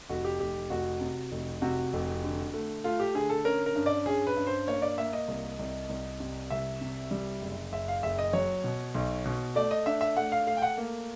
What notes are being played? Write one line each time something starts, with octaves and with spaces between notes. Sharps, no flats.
F1 F#4
G4
F1 G4
F1 F#4
C3
F1
C3 F#4
F1
D3
A3
A3 F4
G4
D3 G#4
A4
C#4 A#4
A#4
G2
D5
C#4 G#4
B4
G2
C5
A#3 C#5
D5
A#3 E5
D#5
C2
C2
C2
C3
C2 E5
C3
G3
F#1
F#1 E5
F5
F#1 E5
D#5
F#3 C#5
B2
B1
B2
A3 D5
D#5
D4 E5
E5
A3 F#5
F5
A3 F5
G5
F#5
A#3